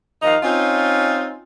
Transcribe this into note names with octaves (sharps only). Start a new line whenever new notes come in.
D#2 D#3 F3 D#4 D#5 F5
C4 C#4 D#4 F4